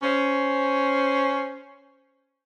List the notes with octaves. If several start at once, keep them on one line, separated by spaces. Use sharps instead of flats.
C#4 C5